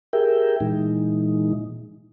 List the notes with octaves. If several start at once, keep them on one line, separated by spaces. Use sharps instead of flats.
G4 G#4 A#4 E5 G5
A#2 E3 G#3 D#4